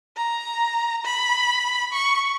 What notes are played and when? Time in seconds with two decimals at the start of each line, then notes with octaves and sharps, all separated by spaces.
0.16 A#5
1.05 B5
1.93 C#6